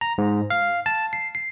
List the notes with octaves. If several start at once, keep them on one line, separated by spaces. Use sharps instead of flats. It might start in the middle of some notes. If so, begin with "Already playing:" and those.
A#5
G#2
F5
A5
C7
C7